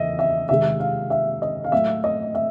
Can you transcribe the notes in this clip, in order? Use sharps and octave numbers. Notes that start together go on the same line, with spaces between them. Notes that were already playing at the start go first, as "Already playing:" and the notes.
Already playing: E2 C#3 D#5 E5
E5
C3 D#3 G#3 E5
F5
E5
D#5
F5
A2 F#3 A3 E5
D#5
E5